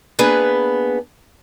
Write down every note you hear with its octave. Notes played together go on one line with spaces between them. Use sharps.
A#3 B3 D4 G#4 B4